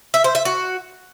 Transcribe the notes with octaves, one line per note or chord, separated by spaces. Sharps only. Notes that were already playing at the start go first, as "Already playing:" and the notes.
E5
C5
E5
F#4